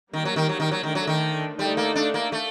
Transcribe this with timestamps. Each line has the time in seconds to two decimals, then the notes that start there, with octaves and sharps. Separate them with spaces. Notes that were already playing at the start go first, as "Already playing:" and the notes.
0.13 D#3 G3 A#3 D#4 F#4 A#4
0.25 F#3
0.36 D#3
0.49 F#3
0.60 D#3
0.71 F#3
0.83 D3 D#3 A3 D4
0.95 F#3
1.07 D#3
1.59 D3 G3 A3 D#4 A4 D5
1.77 A#3
1.95 D4
2.14 A#3
2.32 A3